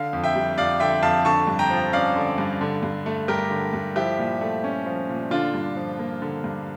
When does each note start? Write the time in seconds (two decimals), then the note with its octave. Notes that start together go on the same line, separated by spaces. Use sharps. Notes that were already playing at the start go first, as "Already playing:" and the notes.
Already playing: D3 F5
0.13 F2
0.24 E5 G5
0.35 G3
0.57 F2 D5 F5
0.80 D3 E5 G5
1.03 F2 F5 A5
1.25 D3 A5 C#6
1.47 G2
1.59 G5 A#5
1.70 F3
1.92 C#4 D5 F5
2.16 D3
2.38 G2
2.61 D3
2.83 G2
3.06 A3
3.28 G2 G4 A#4
3.51 D3
3.73 G2
3.96 F3 E4 G4
4.18 A#2
4.41 A3
4.64 C#4
4.86 F3
5.09 A#2
5.31 D3 D4 F4
5.54 G2
5.76 F3
5.99 A#3
6.22 D3
6.44 G2